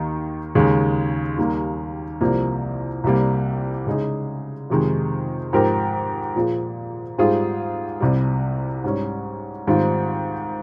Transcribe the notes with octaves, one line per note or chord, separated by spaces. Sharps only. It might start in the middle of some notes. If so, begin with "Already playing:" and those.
Already playing: D#2 D#3 A#3 D#4
D#2 C#3 G#3
D#2 D#3 G3 A#3
C2 C3 F3 A#3
C2 C3 G3 A#3
C#3 G#3 D#4 G#4
F2 C3 D#3 G#3
G#2 F3 C4 G4 A#4
A#2 F3 A#3 F4 G#4
G#2 G3 C4 F4 G#4
C2 C3 G3
G#2 G3 C#4
G#2 D#3 G3 C4 F4